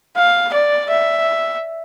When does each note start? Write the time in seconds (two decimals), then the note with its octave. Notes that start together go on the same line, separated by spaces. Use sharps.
0.17 F5
0.54 D5
0.90 E5